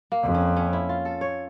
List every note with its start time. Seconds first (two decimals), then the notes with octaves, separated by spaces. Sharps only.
0.12 A#3
0.23 F2
0.35 C#4
0.56 C#4
0.73 E4
0.89 F4
1.05 A4
1.21 C#5